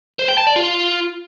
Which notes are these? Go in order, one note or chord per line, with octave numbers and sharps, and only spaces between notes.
C5
G5
A5
D5
F4